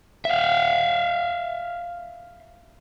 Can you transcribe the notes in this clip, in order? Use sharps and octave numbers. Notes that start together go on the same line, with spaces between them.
E5 F5